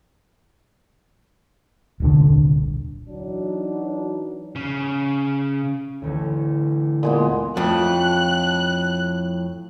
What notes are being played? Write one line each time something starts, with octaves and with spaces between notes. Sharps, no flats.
D#1 C2 D3
E3 F#3 D4 D#4
C#3
A1 D2
A#2 G#3 B3
F2 A2 F#6